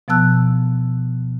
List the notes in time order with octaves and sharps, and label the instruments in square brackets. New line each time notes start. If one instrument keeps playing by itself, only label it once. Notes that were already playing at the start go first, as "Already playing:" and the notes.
[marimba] B2 F3 B3 A5 E6 F#6